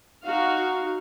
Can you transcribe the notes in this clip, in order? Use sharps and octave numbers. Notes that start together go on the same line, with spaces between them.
D#4 F#4 F5